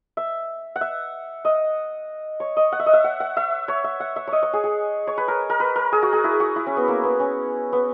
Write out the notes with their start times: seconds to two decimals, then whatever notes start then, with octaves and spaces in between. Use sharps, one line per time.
0.17 E5
0.76 F#5
0.81 E5
1.45 D#5
2.40 C#5
2.57 D#5
2.72 F#5
2.79 E5
2.86 D#5
2.93 E5
3.04 F#5
3.20 F#5
3.37 E5
3.68 C#5
3.84 E5
4.00 F#5
4.16 E5
4.27 C#5 D#5
4.43 C#5
4.53 G#4
4.64 G#4
5.07 C#5
5.17 B4
5.28 A#4
5.50 A#4
5.60 B4
5.76 A#4
5.92 G#4
6.02 F#4
6.13 G#4
6.24 E4
6.40 F#4
6.56 E4
6.66 C#4
6.77 B3
6.88 A#3
7.04 B3
7.20 C#4
7.73 B3